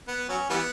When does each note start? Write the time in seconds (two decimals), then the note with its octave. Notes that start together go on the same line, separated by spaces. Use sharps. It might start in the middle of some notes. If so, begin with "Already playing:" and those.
0.08 B3
0.29 F#3 C#4
0.50 E3 G3 B3